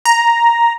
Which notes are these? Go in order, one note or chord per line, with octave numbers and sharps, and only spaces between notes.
A#5